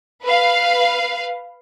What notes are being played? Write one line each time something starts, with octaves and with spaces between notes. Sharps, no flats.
B4 F5